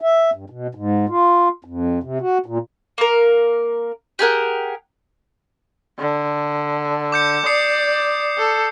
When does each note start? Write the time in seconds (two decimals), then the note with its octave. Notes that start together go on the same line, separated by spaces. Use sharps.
0.01 E5
0.34 G2
0.50 B2
0.75 G#2
1.09 F4
1.65 F2
2.03 C3
2.21 F#4
2.46 A#2
2.98 A#3 A#4
4.19 G4 G#4 A#4 F#5
5.99 D3
7.12 D6 G6 C#7
7.46 D5 D#6 C7 C#7
8.38 A4